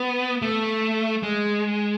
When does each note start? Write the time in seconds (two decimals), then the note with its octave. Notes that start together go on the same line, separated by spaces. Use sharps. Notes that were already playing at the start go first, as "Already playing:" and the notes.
Already playing: B3
0.42 A3
1.23 G#3